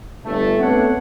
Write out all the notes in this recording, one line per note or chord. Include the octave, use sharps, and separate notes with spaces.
G1 A3
A3 B3 C4 D4 C#5 F#5